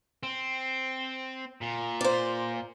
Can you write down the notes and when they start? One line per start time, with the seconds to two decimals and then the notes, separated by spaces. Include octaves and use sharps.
0.23 C4
1.62 A#2
2.01 C5 D5